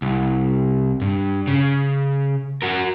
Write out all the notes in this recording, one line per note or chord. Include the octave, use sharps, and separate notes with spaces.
C2
G2
C#3
F#4 A#4